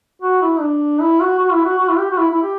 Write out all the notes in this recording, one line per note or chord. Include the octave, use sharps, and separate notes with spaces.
F#4
E4
D4
E4
F#4
F#4
E4
F#4
F#4
E4
G4
F#4
E4
E4
G4